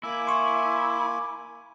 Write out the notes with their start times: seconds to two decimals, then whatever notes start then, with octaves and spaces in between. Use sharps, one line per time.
0.03 A#3 E4 G#5 D6
0.27 C6 C#6